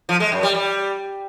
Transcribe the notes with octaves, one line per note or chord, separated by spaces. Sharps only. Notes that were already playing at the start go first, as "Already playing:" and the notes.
F3
G#3
F#2
G3
G3